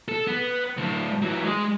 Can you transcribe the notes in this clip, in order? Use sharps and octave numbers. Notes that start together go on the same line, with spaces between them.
A4
B3
D2 A2
E3 F#3
G#3 G#4